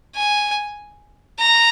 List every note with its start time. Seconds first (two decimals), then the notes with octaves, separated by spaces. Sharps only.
0.15 G#5
1.39 A#5